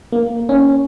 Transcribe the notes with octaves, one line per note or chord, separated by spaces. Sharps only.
A#3
C#4